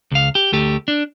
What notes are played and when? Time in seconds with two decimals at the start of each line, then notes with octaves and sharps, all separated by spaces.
0.11 C#2 F5
0.35 G4
0.52 D2 A3 G4
0.88 D4